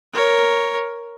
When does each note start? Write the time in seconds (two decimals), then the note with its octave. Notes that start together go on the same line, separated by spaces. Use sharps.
0.13 A#4 C#5